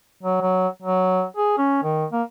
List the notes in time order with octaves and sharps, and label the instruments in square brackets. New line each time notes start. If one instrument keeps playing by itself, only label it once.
[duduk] F#3
F#3
F#3
G#4
C#4
D#3
A#3